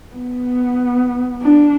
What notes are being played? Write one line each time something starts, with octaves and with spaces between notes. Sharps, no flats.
B3
D4